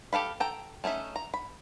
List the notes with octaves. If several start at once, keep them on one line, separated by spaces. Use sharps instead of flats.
G4 A4 F5 B5
A4 G5 A#5
A3 C#4 D#4 E5
A#5
B5